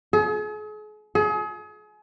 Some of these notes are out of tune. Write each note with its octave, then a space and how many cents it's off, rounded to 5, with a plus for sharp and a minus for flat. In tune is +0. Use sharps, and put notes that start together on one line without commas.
G#4 +40
G#4 +35